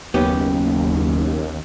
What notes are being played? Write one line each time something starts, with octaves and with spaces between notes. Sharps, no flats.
F#1 D#2 B3 C#4 G4